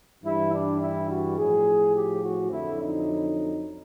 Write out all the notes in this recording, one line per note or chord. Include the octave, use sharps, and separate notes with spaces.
G2 E3 G3 E4
D4
E4
F#4
A2 F3 G#4
G4
F#4
F2 D3 F#3 E4
D#4